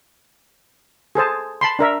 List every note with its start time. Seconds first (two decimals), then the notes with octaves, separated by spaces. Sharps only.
1.15 G#4 A4 C5 A5
1.61 A5 B5 C6
1.79 D4 A#4 E5